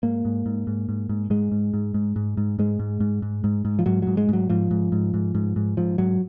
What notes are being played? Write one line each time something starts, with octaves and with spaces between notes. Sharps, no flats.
G#2 A#3
G#2
G#2
G#2
G#2
G#2
G#2 G#3
G#2
G#2
G#2
G#2
G#2
G#2 G#3
G#2
G#2
G#2
G#2
G#2
F3
G#2 F#3
G#2 F#3
G#3
G#2 F#3
G#2 F3
G#2
G#2
G#2
G#2
G#2
G#2 F3
G#2 F#3